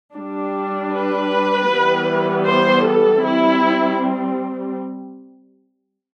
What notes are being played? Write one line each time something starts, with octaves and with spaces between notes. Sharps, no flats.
G3 D4
B4
E3 G3 B3
C5
A4
G3 C4 E4